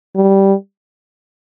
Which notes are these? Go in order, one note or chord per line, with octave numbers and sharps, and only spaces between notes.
G3